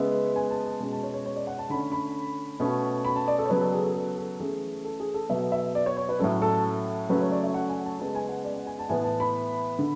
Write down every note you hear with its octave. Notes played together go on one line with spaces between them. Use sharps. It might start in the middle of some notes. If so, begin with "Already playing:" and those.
Already playing: C#3 G#3 B3 E5
G#5
A5
A5
B2 G#3 C#4
A5
C#5
C#5
C#5
D5
F#5
A5
D3 A3 C#4 B5
B5
B2 A3 C#4
B5
A5
D5
A4
C#5
C#3 F#3 B3 B4
A4
G#4
A4
A4
A4
E3 A3 C#4 G#4
A4
G#4
A4
B2 F#3 B3 E5
E5
D5
C#5
C#5
B4
A2 F#3 C#4 A4
A4
C#3 F#3 A3 C#4 B4
C#5
D5
E5
F#5
G#5
A5
C#3 G#3 B3 A5
G#5
F#5
D5
F#5
G#5
A5
A2 E3 B3 G#5
A5
B5
D3